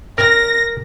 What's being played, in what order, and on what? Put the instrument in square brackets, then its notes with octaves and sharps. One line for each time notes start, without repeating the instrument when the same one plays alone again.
[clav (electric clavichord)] A#4 [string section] A#6